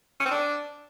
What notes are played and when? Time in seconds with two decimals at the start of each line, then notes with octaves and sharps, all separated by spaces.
0.20 C#4
0.26 C4
0.31 D4